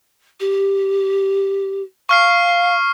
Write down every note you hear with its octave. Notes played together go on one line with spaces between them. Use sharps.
G4
F5 C#6 F6 C7